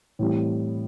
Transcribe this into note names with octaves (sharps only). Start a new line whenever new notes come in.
A2 E3 G3 C4